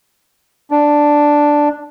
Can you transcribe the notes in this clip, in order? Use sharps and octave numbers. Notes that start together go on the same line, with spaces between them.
D4